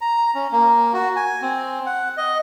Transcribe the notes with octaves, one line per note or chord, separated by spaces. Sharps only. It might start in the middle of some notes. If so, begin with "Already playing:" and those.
A#5
C#4
A#3
F#4
G#5
C4
F#5
D#5